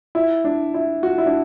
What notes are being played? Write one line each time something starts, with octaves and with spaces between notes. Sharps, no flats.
E4
D4
E4
F#4
E4
D4